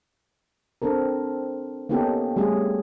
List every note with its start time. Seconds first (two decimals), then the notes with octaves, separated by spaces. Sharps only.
0.82 C4 D4 A4 A#4
1.89 A#3 B3 C#4 D#4 G4 A4
2.36 G3 A3 C#4 G#4